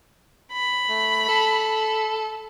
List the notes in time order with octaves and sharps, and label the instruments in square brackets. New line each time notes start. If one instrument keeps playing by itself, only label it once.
[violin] B5
[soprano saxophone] A3
A4